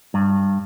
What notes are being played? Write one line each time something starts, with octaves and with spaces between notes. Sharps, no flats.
G2